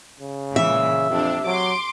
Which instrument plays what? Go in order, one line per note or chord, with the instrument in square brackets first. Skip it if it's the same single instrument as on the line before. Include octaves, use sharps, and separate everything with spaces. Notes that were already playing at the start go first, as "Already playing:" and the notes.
[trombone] C#3
[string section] A#2 E3 G#3 [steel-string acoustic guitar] E5
[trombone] F2 [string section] C3 D4
[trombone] F#3 [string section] C6 D6